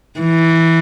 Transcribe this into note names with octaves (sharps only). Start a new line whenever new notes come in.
E3